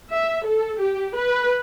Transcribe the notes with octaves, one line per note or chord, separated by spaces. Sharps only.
E5
A4
G4
B4